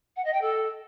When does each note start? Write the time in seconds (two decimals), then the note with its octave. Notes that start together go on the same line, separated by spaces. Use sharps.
0.16 F#5
0.24 D#5
0.32 G5
0.41 A4